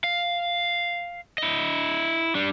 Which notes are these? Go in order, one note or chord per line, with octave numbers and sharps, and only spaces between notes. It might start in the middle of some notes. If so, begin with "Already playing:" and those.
F5
E4 D#5
G3 D4